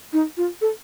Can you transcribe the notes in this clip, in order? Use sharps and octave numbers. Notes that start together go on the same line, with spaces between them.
D#4
F4
A4